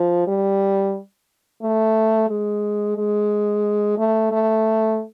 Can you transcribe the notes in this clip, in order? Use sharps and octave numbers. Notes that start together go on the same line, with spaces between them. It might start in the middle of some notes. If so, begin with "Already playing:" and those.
Already playing: F3
G3
A3
G#3
G#3
A3
A3